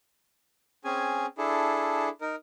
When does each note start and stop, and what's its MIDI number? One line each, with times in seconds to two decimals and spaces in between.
0.85 1.26 60
0.85 1.26 61
0.85 1.26 68
0.85 1.26 80
1.38 2.09 62
1.38 2.09 64
1.38 2.09 68
1.38 2.09 69
2.21 2.36 63
2.21 2.36 70